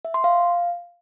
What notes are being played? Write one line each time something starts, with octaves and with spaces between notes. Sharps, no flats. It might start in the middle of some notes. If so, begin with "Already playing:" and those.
E5
C6
F5